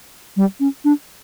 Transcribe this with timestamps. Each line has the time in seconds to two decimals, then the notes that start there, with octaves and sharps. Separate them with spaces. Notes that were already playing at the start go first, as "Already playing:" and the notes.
0.37 G3
0.60 C#4
0.85 D4